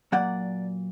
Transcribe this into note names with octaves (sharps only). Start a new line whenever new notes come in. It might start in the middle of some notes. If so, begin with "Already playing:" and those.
A#2 F#3 A#3 D5 F#5